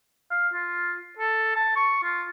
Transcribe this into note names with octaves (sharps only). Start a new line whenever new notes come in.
F5
F4
A4
A5
C#6
F4